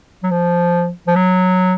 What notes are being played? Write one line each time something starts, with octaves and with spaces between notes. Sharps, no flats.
F#3
F3
F3
F#3